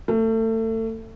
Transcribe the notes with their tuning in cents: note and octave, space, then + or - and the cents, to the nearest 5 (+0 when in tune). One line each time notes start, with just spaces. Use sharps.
A3 +30